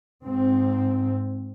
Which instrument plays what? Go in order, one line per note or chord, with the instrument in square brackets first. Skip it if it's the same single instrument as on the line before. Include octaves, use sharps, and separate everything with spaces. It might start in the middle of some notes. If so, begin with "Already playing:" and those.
[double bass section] G#2 C4